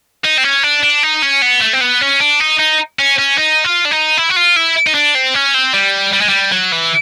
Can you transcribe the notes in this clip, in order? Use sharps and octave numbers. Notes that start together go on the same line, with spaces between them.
D#4
C4
C#4
D4
D4
D#4
C#4
B3
A3
C4
B3
C#4
D4
D#4
D#4
C#4
C#4
D#4
F4
D4
D#4
E4
F#4
F4
E4
D#4
D4
C4
C#4
C4
G3
G3
G#3
G3
F#3
E3